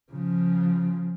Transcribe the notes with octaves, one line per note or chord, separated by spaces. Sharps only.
C#3 F3